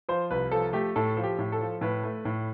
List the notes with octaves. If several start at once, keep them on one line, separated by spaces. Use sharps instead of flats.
F3 C5
C2 B4
F3 A4
A3 G4
A2 A4
F3
G4
A2
A4
F3
A2 B4
A3
A2